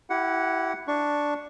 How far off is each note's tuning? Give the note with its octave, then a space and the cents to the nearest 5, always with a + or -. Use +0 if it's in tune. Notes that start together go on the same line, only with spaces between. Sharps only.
E4 +0 G4 -30 F#5 +0
D4 +0 C#6 +0